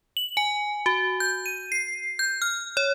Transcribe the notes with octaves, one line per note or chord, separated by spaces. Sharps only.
F#7
G#5
F#4
G6
D#7
C7
G6
F6
C#5